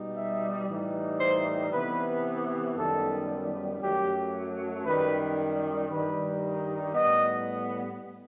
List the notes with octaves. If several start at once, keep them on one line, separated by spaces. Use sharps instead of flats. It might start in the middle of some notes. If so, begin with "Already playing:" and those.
Already playing: B2 G3 D#4
E5
A2 E3 G3 D#4
C5
C3 E3 B3 B4
F#2 D#3 G3 B3 A4
F#2 F#3 A3 G4
F#2 D#3 G3 B4
G2 D#3 G3 D#4 B4
A2 G3 B3 D#5